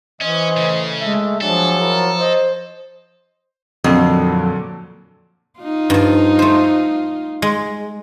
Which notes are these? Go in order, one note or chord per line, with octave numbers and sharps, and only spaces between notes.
E3 C#4 C5 D#5
A2 C#3
G#3 A3 E5
F3 F#3 D4 G#4 A4
E4 A#4
C5 D#5
F2 A#2 D3 F#3
D#4 F4
G2 F3
A3 C5
G#3